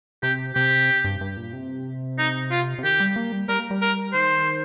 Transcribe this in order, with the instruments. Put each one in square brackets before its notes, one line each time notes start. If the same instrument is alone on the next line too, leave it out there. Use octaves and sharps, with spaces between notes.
[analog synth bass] C3 [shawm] G4
[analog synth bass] C3 [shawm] G4
[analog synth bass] G2
G2
A#2
C3
[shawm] D#4
F4
[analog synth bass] C3
[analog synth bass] D#3 [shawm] G4
[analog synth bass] G3
A#3
G3
[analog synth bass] G3 [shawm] A#4
[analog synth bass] A#3
G3
[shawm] A#4
[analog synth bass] D#3 [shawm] C5